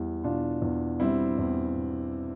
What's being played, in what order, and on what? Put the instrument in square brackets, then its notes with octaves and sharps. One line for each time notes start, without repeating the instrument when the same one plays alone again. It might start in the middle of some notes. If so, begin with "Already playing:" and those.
Already playing: [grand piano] E2 G3 E4 G4
B2 D4 F4
E2
G3 C4 E4
E2
B2